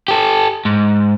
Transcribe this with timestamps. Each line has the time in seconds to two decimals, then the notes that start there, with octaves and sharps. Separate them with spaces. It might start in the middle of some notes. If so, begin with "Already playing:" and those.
0.08 G4 A4
0.65 G#2